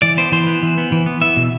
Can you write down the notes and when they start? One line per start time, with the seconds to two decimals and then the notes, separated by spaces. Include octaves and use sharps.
0.02 E3 D5
0.17 B3 C5
0.32 E3 C5
0.47 B3
0.63 E3
0.78 B3
0.92 E3
1.06 B3
1.21 B3 E5
1.36 B2